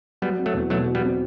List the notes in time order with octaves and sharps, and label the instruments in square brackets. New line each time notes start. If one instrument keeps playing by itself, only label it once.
[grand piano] F#3 [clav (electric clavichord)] G3 B3
[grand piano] C4
[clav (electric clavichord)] F#3 A3
[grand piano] E2
[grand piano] B2 [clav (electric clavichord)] F#3 A3
[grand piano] F#3
[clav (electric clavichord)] G3 B3
[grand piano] C4